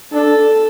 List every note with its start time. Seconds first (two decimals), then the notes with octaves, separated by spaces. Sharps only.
0.12 D4 A4